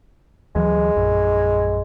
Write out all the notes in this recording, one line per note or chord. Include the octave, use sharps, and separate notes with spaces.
D2 E3 F#3 G#3
A#1 F#2